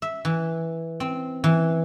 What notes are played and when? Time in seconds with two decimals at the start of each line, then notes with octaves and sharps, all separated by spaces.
0.02 E5
0.25 E3
1.00 C4
1.44 E3